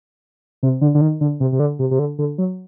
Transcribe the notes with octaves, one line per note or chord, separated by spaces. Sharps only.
C3
D3
D3
D#3
D3
C3
C3
D3
C3
C3
D3
D3
F#3